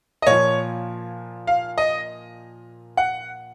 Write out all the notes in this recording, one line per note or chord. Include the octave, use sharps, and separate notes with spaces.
D#5
A#2 F3 C#5
F5
D#5
F#5